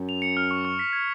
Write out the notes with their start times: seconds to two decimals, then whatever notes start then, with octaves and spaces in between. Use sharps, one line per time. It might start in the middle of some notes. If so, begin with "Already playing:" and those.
Already playing: F#2
0.09 F7
0.22 C#7
0.37 F6
0.51 C#6
0.65 C#6
0.79 B6
0.93 G#6